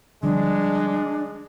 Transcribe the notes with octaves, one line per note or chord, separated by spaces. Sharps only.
D3 F3 G3 G#3 D4